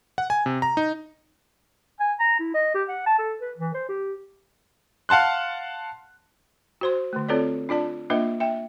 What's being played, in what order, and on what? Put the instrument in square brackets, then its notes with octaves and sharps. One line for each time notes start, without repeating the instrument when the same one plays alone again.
[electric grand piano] F#5
G#5
C3
A#5
D#4
[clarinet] G#5
A#5
E4
D#5
G4
F#5
A5
A4
B4
E3
C5
G4
[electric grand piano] F5 F#5 A5 C6 F#6
[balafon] F#4 C5 C6
D3 A3
C4 F4 A4 B4 C#5 D5
D4 F4 D5 A5
A#3 D4 F4 B4 D#5 E5
E5 G5